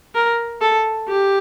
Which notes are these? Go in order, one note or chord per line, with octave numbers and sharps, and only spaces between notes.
A#4
A4
G4